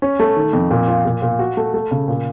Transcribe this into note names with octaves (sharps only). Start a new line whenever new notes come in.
C#4
A3
D#3
F2
A#2
F4
A#2
A#2
F#4
A3
A3
C#3
A#2